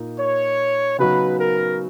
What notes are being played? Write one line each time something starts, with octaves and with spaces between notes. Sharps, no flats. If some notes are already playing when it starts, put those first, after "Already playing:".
Already playing: A#2 A#3 D#4
C#5
C#3 F#3 B3 D#4 F#4 B4
A#4